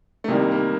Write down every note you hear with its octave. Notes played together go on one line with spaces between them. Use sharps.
A3
C2 C3 D#3 G3 A#3
A#3